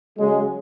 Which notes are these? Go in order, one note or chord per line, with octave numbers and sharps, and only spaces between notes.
C#3 F#3 G#3